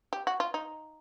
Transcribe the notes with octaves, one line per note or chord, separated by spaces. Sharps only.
G4
F#4
F4
D#4